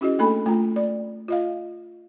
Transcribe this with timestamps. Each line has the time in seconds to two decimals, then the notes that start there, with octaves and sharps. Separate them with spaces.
0.01 C#4 E4 F#4 G#4 D#5
0.19 A3 A#3 D4 A4 G#5 B5
0.46 A3 F4 G5 A#5
0.76 D5
1.28 F4 D#5 F5